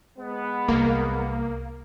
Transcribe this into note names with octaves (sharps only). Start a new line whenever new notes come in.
G#3 B3
C2 A#3